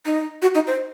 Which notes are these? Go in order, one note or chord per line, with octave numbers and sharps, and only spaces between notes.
D#4
F#4
D#4
C5